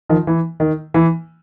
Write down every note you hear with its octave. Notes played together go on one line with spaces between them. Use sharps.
D#3 F3
E3
D#3
E3